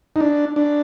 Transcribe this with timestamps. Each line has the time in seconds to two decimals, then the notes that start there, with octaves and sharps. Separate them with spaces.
0.16 D#4
0.21 D4
0.56 D4